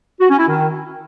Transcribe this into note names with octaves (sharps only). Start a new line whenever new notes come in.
F#4
C#4
E4
D#3